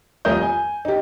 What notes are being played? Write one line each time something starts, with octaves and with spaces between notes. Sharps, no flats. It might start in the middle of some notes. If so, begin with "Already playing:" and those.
D#1 F2 A#4 D#5 G6
G#5
D#4 G4